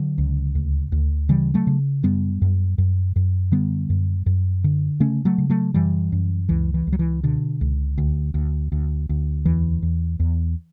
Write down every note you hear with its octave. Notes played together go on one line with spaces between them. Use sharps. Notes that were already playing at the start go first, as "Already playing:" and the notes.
Already playing: D3 F#3
C#2
D2
D2
C#3 E3 G3
F#3 A3
C#3
F#2 G3 B3
F#2
F#2
F#2
D3 G3 B3
F#2
F#2
D3
C#3 A3 C#4
F#3 A3
C#3
F#3 A3
F#2 E3 G3
F#2
C#2 E3
E3
C#2
F#3
E3
B2 D3
C#2
D2
D2
D2
D2
E2 E3
E2
E2